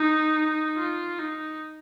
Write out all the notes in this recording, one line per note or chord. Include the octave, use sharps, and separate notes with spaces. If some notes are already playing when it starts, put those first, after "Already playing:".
Already playing: D#4
F4
D#4